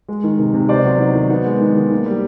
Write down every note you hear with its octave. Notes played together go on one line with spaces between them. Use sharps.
G#3
D#3
C3
C3
B3 C5 D5
F#3
D#4
D#3
B3
G#3
D#3
D#3
A#3
G3